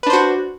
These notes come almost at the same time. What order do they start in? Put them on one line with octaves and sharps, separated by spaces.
B4 D4 C5 F#4